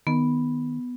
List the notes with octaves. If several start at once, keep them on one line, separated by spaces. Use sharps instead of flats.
D#3 B3